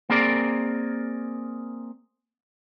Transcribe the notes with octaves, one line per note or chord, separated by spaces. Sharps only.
A#3 C4 G#4 A#4 D5